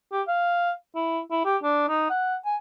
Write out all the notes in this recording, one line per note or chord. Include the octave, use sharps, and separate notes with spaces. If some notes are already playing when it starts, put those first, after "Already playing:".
G4
F5
E4
E4
G4
D4
D#4
F#5
G#5